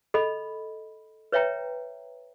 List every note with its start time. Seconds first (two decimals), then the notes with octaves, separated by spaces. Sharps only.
0.14 A4 D#5 B5
1.32 B4 C#5 E5 G5 A#5